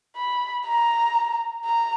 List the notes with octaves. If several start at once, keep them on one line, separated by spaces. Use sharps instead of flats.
B5
A#5
A#5